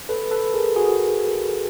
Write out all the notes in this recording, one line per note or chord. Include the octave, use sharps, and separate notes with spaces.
A4 B4
A4 B4
G#4 A#4
F#4 G#4